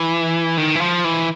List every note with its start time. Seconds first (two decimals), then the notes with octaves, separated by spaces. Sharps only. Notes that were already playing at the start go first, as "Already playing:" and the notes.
Already playing: E3
0.57 D#3
0.75 E3
0.81 F3
1.04 E3